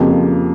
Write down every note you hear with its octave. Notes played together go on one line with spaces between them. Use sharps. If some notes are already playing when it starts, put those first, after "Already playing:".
Already playing: F2 C#3 F3 A#3 G4